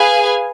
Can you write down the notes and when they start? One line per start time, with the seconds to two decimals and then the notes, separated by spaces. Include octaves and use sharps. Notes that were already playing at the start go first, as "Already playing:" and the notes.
Already playing: G#4 B4 F5 G#5